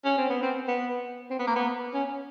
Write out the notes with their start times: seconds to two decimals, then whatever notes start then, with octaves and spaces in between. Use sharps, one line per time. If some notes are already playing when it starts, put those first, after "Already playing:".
0.05 C#4
0.18 C4
0.30 B3
0.43 C4
0.68 B3
1.30 C4
1.39 B3
1.47 A#3
1.56 B3
1.94 C#4